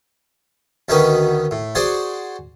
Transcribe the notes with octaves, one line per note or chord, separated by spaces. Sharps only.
D2 D#3 C#4 D#4 F#4 B4
A2
F#4 G#4 C5 D5 F#5